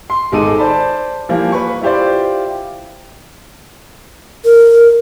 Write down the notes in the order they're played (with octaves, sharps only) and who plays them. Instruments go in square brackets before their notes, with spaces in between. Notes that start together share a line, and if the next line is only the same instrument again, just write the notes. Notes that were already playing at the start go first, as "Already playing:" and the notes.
[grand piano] C6
G#1 G#3 D#4 A4 D6 D#7
C5 D5 A5 B5
E3 F3 G3 A#3
B4 B5 C#6
E4 F4 G4 C5 D5
[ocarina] A#4